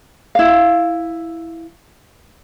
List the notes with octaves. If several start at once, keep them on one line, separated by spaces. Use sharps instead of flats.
E4 F5